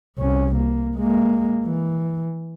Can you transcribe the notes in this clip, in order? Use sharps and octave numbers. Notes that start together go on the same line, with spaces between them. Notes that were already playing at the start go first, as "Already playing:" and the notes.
C2 C#4
A#3
G#3 A#3
E3